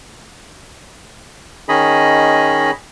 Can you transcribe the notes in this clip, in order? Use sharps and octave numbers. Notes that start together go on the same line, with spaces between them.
D#3 C#4 D#4 G#4 D#5 B5